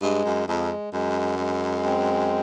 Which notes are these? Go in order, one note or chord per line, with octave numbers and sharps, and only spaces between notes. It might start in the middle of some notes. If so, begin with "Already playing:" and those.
G2 G#3
F#2
F2 G#3
F#2 G#3
G#3
C4